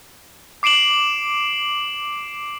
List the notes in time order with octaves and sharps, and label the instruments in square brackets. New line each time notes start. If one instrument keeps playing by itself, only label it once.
[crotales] D6 C7 D7 E7 F#7